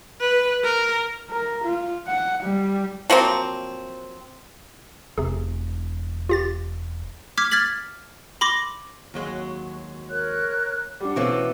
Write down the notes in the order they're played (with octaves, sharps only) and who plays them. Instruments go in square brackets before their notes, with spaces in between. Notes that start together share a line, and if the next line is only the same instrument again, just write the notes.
[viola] B4
A#4
[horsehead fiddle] A#4
F4
F#5
G3
[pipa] F3 F#3 A#3 C4
[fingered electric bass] E1 [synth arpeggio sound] C3 G#4
[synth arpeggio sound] F4 G4 A6
[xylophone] D6 F6 G#6 B6
F6 G#6 A6 B6 F#7
B5 C6 D6 A#6
[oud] D#2 F#3 G#3
[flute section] A#4 C#5 F#6
[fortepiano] G3 D4 [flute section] F#5 D6
[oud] B2 E3 A3 [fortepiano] C4 C#4